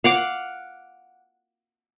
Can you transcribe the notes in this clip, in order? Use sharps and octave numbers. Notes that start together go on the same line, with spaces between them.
F5 F#5 D6